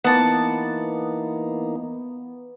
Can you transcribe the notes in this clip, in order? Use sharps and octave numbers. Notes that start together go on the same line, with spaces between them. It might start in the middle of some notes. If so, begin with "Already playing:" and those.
E3 A#3 B3 D#4 F#5 A5 D6